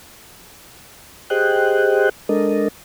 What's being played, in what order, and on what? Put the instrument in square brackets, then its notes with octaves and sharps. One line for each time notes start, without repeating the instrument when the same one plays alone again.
[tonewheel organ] G4 G#4 C5 D#5 G5 F#6
G#3 D4 A4 A#4 D#5